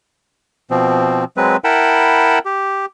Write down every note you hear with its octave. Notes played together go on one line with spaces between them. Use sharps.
B2 F3 C4
F#3 G#3 C4 B4
E4 A#4 F#5 G5 A5 B5
G4